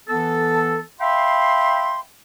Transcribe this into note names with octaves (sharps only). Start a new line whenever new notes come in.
E3 B3 A4
E5 F5 G5 B5 C6